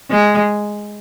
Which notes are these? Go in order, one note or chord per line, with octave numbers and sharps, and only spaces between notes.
G#3